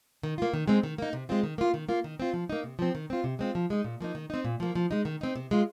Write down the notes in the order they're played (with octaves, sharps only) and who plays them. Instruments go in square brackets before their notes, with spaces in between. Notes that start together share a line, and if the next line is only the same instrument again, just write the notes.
[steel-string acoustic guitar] D#3
A#3 F4
D#3
G#3 C4 D#4
D#3
A#3 D#4
C3
G#3 C4 F4
D#3
A#3 F4
D#3
A#3 F4
D#3
C4 F4
F3
A#3 D#4
C3
F3 C4
D#3
C4 F4
C3
G#3 C4 F4
F3
G#3 D#4
A#2
F3 A#3 D#4
D#3
C4 D#4
A#2
F3 A#3
F3
G#3 D#4
D#3
C4 D#4
C3
G#3 F4